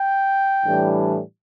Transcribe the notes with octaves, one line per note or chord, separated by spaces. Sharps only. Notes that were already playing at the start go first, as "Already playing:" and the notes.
Already playing: G5
A2 E3 G3 D4